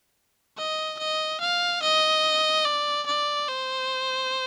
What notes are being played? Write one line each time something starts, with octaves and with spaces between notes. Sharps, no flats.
D#5
D#5
F5
D#5
D5
D5
C5